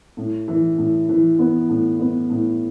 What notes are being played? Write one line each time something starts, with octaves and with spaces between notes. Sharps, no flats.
A2
E3
A2
E3
B3
A2
B3
A2